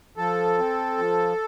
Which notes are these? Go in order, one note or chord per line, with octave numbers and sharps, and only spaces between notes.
F3 A4
C4
F3